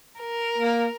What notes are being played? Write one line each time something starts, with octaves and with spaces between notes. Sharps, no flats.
A#4
A#3